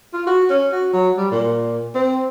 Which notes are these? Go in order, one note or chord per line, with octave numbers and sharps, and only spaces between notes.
F4
F#4
C#4
F#4
F#3
G3
A#2
C4